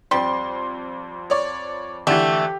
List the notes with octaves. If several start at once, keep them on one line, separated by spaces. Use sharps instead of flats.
F2 G3 C4 C6
C#5 D5
D3 E3 A3 G4